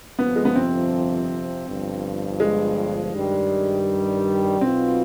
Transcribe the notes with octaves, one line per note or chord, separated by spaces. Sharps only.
G1 F2 C3 F3 B3
G#3
B3
C4
G1 G2 F3
G#3
G2 D#3 G3
B1 B2 B3 C4 F4